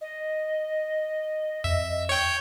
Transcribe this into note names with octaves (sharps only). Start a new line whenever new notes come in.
D#5
F2 E5
C#5 G5